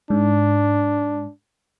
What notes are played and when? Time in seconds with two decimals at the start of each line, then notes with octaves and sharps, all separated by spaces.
0.10 G#2 D4